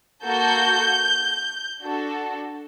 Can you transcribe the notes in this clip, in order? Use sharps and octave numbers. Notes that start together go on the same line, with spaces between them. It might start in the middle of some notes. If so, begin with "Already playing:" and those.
A#3 F#4 A4 G6
D4 F#4 A4